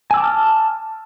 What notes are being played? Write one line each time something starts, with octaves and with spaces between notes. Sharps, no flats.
G#5 A5 D6 E6 F6